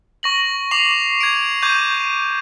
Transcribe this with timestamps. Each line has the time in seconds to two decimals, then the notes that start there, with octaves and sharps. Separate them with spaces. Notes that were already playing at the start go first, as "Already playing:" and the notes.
0.23 C#6 A#6 F#7
0.71 C#6 D6 C7 F7 F#7
1.21 G#6 D7
1.62 C#6 D6 G6 G#6 D#7